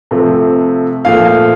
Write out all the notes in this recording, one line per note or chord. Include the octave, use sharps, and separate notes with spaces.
C3 F3 A3
A#2 F3 A3 F5